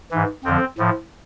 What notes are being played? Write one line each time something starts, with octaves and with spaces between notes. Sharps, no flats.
G#2 E3
F2 D3 F3 C4
A2 F3